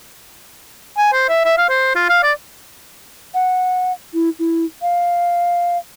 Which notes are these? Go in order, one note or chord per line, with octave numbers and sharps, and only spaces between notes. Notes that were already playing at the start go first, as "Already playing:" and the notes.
G#5
C5
E5
E5
F5
C5
F4
F5
D5
F#5
E4
E4
F5